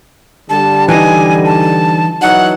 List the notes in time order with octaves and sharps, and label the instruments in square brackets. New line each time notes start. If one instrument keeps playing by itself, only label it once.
[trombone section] D3 G3 [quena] A5
[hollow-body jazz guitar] E3 D#4 [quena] G#5
[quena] A5
[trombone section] E3 F#3 D#4 [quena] F#5